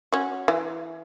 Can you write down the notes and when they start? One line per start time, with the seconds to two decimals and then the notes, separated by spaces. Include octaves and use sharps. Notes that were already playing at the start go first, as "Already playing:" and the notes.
0.12 C#4 F#4
0.48 E3